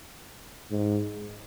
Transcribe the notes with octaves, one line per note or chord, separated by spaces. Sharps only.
G#2